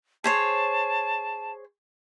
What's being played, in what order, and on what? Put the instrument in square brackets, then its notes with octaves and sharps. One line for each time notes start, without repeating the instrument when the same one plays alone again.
[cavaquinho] G#4 C5 C#5 [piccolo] A5